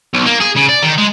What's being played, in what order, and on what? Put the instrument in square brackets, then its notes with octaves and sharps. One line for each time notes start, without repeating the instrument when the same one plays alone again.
[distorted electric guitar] B1
A#3
G#4
C#3
D5
D#3
G#3